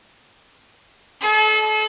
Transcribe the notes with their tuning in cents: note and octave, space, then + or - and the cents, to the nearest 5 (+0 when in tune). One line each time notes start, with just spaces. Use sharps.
A4 -35 D5 +45